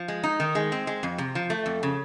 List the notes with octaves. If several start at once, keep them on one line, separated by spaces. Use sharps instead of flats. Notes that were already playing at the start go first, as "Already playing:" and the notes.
Already playing: F3
G#3
D#4
D#3
G#3
C4
G#3
F2
C3
F3
A3
F2
C#3